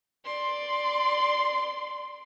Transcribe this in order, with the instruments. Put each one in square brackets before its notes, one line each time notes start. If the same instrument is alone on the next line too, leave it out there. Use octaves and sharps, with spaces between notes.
[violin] D5 C6